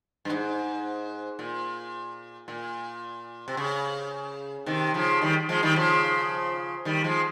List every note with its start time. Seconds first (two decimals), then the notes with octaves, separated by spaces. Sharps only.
0.25 G2
0.30 G#2
1.39 A#2
2.48 A#2
3.48 C3
3.57 C#3
4.66 C3 D#3
4.94 C#3 F3
5.22 D#3 G3
5.49 F3 G#3
5.63 D#3 G3
5.76 C#3 F3
6.85 D#3 G3
7.04 F3 G#3